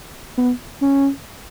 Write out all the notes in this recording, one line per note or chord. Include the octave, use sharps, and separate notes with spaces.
B3
C#4